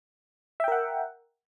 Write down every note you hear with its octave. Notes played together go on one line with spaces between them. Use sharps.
A#4 E5 F#5 G5